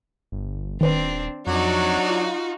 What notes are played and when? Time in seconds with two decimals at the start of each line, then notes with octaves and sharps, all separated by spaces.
0.32 G1
0.81 D#1 D#3 C4 D4 B4 C5
1.47 F2 F#3 D4 D#4 F#4
2.10 F4